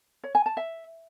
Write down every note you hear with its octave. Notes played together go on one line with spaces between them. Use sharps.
C#5
G#5
A5
E5